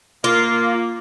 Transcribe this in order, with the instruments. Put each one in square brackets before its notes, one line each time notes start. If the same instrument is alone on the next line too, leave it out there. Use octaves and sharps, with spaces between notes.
[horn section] A#3 [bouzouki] F4